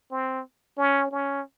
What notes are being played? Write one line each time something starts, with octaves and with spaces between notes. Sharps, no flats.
C4
C#4
C#4